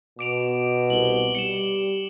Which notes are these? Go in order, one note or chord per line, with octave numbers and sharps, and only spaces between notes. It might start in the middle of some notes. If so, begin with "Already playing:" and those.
B2 D6 D7 F7
C2 F#7 G7
G3 C#7 E7